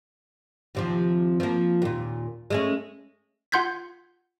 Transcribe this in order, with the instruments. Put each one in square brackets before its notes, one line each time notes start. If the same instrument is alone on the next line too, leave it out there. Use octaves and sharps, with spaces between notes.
[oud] D#2 C3 F3
F3 A#3
D#2 A#2
G#3 A3 C#4
[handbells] F4 F#5 C6 G6 G#6 B6